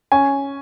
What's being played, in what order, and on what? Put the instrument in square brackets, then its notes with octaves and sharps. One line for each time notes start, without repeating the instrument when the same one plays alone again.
[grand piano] C#4 G#5